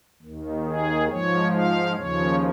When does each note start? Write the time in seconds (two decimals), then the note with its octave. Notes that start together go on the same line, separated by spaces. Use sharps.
0.22 D#2 D#3
0.65 G#4
1.09 G#2 F3 C#5
1.53 F5
1.96 D#2 C#3 F3 C#5